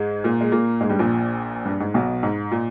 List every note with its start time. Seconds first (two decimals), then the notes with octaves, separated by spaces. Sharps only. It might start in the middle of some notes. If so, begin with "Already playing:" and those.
Already playing: G#2 G#3
0.24 A#2 A#3
0.41 G#3
0.52 A#2 A#3
0.80 G#2 G#3
0.89 G2 G3
0.99 A#1 A#2
1.65 G2
1.80 G#2
1.94 B1 B2
2.23 G#2
2.51 A#2